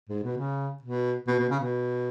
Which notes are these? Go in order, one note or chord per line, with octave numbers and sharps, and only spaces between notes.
G#2
B2
C#3
B2
B2
B2
C#3
B2